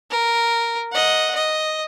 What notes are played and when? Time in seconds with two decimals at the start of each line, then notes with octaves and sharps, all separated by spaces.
0.11 A#4
0.92 D#5 F#5
1.35 D#5